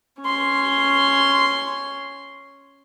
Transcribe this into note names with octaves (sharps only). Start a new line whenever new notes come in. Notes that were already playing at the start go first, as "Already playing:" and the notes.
C#4 C6